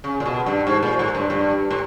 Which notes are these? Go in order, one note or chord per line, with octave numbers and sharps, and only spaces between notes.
C#3
A#2
B2
G2
G#2
A#2
A2
G2
G2
A2